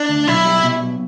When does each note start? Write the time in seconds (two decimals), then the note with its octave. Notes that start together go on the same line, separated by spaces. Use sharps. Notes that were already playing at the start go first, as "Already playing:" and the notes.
Already playing: D4
0.09 D2
0.27 B1 E4
0.45 G3
0.64 B2
0.81 B1